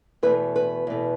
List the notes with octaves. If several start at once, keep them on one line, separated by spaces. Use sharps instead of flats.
E2 B2 A3 B4
B4
E2 B2 A3